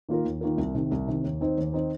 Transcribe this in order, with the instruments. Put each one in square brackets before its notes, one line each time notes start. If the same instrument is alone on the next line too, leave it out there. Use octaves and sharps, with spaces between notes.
[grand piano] D#3 A#3 F4 A#4
D#2
D#3 A#3 F4 A#4
C2
C3 D#3
C2
C3 D#3
D#2
D#3 C4 D#4 C5
D#2
D#3 C4 D#4 C5